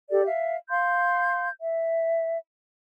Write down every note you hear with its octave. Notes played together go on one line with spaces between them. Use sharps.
G4 A4 D5
E5 F5
F5 C6 G6
E5